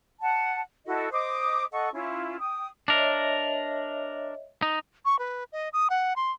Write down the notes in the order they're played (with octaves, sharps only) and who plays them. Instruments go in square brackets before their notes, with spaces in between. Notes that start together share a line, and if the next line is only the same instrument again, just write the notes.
[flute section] F#5 A5
E4 F#4 A4 D#5
C5 D#5 D6 D#6
A4 D#5 F#5 C#6
C#4 E4 F4
G5 D#6
[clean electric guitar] D4 A#4 [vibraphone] C#5 D#5 E5
[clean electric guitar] D#4
[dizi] C#6
B4
D#5
D#6
F#5
C6